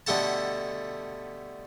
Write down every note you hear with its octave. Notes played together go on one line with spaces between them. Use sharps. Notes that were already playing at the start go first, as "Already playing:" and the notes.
B2 D3 G3 A3 F#5 A5